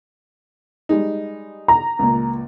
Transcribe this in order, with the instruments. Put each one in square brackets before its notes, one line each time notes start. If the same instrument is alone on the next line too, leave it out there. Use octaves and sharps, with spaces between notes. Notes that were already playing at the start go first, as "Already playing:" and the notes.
[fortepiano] G3 G#3 D#4
[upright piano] A#5
[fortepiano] C#2 A#2